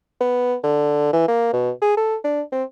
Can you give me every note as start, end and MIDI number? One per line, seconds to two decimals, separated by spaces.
0.21 0.56 59
0.64 1.09 50
1.13 1.28 52
1.28 1.49 58
1.53 1.71 47
1.82 1.92 68
1.97 2.16 69
2.24 2.41 62
2.52 2.64 60